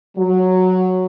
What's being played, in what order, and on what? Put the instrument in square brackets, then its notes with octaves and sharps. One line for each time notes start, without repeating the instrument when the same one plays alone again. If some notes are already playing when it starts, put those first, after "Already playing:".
[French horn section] F#3